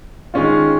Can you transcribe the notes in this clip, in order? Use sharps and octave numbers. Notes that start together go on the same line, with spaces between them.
D#3 G#3 C#4 F4